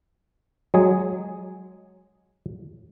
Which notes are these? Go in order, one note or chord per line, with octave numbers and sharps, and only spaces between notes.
F#3 G#3 G#4